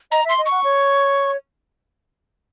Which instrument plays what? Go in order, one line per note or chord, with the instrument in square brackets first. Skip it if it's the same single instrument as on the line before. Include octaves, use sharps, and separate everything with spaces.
[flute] D#5 [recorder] A#5
[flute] E5
[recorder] C6
[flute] D#5
[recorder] C#6
[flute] F#5
C#5